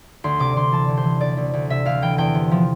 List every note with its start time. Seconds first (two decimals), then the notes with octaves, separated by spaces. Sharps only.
0.24 D2 C6
0.39 C3 D6
0.56 D2 C6
0.72 E3 A5
0.88 D2
0.97 C5
1.04 E3
1.21 D2 D5
1.37 D2
1.53 D2
1.70 C3 E5
1.85 D2 F5
2.02 E3 G5
2.18 E2 G5
2.35 C3
2.51 F3